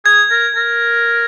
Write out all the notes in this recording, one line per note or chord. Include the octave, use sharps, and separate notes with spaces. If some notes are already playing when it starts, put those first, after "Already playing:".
G#4 G#6
A#4
A#4